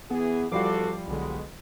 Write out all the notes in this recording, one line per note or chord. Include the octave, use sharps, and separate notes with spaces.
E3 B3 G#4
E2 F3 G3 F4 F#4 A4 D6 C7
B1 B2 D3 G#3